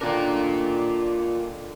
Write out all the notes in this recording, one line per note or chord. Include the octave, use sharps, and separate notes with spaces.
D3 D#3 D4 F4 A#4